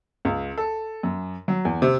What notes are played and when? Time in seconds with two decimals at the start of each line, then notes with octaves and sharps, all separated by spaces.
0.25 C#2
0.58 A4
1.03 F#2
1.48 F#3
1.65 E2
1.82 C3